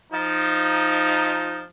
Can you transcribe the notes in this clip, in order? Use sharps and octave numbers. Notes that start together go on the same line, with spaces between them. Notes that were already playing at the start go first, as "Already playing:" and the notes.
F3 D#4